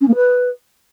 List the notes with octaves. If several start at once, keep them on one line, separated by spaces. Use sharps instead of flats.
C#4
A#3
B4